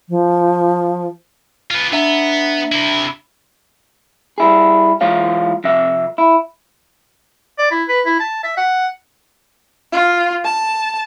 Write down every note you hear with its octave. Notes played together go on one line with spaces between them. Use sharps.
F3
F4 B4
B3 D4 E5 A#5
C3 E4
G3 E4 G#4
E3 G#3 F4 C#5 F5
F2 C3 E5
E4
D5
E4
B4
E4
A5
E5
F#5
F4
A5